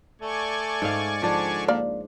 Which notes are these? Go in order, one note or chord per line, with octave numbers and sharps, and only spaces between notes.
A3 D5 G#5 C#6
G#2 F5
D3 F3 D4
A#3 D5